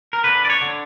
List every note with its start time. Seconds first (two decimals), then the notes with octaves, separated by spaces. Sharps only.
0.13 A#4
0.24 D3 B4
0.45 D5
0.50 C#5
0.61 D3